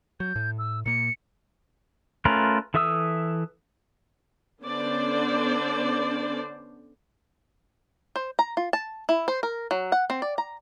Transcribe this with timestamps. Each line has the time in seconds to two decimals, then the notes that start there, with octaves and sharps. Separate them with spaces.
0.20 F#3 G6
0.36 A2
0.59 E6
0.86 A#2 A#3 C#7
2.25 A3 C#4 F4 A#4 B4
2.74 E3 A4 E5 D#6 E6
4.62 D3 B3 C#4 D4 C5 D5
8.16 C5
8.39 A#5
8.57 F4
8.73 A5
9.09 E4
9.28 C5
9.43 A#4
9.71 F#3
9.92 F#5
10.10 C4
10.22 D5
10.38 A#5